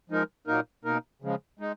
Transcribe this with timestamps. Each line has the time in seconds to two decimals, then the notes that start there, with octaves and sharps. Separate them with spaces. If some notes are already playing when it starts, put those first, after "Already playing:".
0.10 F3 G#3 D#4 A#4
0.47 A#2 F#3 A#3 D#4 A#4
0.84 B2 A#3 D#4 A#4
1.22 C#3 F3 G#3
1.59 G#3 D#4